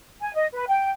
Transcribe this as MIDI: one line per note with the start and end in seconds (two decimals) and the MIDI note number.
0.21 0.32 80
0.35 0.47 75
0.54 0.64 71
0.68 0.90 79